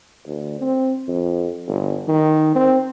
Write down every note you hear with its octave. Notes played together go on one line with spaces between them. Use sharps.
D2
C4
F2
G1
D#3
C4